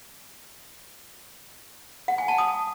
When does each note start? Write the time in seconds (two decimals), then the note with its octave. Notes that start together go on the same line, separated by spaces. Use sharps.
2.08 F#5
2.18 G#5
2.28 A5
2.38 D#6